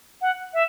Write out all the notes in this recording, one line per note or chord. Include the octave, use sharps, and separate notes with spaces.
F#5
E5